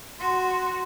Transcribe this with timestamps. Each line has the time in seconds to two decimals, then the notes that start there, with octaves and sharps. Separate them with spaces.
0.20 F#4 C6